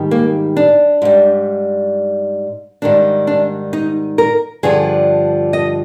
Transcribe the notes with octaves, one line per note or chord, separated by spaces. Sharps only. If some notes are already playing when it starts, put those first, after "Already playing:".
Already playing: G#2 D#3 G3
A#3
D4
G#2 G3
G#2 D#3 G3 D4
D4
D#4
A#4
G2 D3 F3 G#4
D#5